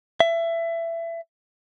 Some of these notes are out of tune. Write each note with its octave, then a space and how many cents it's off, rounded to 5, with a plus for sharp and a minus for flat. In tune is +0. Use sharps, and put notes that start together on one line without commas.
E5 +20